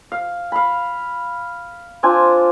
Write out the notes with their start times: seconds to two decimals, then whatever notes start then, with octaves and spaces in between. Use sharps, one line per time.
0.12 F5
0.52 F5 B5
2.03 C4 D4 F4 G#5